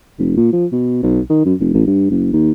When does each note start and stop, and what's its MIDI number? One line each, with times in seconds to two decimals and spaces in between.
0.18 0.36 29
0.37 0.50 46
0.53 0.66 53
0.72 1.02 47
1.02 1.20 35
1.29 1.44 51
1.45 1.54 42
1.60 1.69 29
1.74 1.84 33
1.86 2.09 43
2.11 2.31 30
2.33 2.52 39